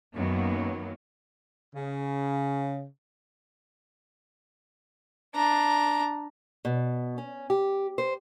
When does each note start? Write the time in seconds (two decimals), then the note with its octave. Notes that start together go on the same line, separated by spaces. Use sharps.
0.15 F#2 D#3 F#3 A#3 B3
1.75 C#3
5.35 D4 A#5
6.65 B2
7.18 C#4
7.50 G4
7.98 C5